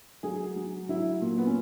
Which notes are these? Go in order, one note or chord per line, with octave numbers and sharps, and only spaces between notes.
F#3 G#4
F#3
F#3 E4
A#2
B3
C#4